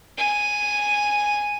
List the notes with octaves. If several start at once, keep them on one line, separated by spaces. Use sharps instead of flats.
G#5